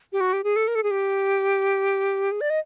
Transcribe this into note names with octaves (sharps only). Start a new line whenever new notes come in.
G4
F#4
G4
G#4
A4
A#4
A4
G#4
G4
G#4
D5
D#5